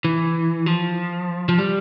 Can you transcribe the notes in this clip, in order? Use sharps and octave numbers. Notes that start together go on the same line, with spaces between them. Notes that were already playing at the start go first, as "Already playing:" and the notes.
E3
F3
F3
G3